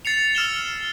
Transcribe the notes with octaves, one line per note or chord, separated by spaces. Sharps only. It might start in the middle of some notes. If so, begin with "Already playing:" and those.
A6 C7 C#7 F7
E6 F6 E7 G7